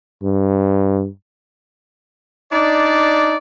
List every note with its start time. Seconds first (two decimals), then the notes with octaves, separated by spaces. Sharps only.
0.23 G2
2.52 D4 D#4 D5